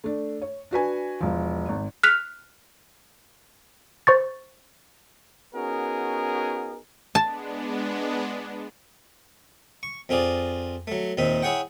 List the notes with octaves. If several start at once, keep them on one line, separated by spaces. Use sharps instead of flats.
A3 D4
C#5
D4 F#4 B4 G#5
E1 F3
G#1
F6 F#6 B6 F7
C5 C#6 A6
B3 C#4 D#4 F#4 G#4 A#4
G#3 B3 D4 A5
C#6
F2 C4 F4 G#4 D5
F#3 A3
D#2 A#2 C4 D#4 E5
E4 G#4 C#5 F#5 G5